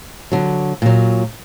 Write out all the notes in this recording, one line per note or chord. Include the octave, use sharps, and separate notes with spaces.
D3 F#3
A#2 F#3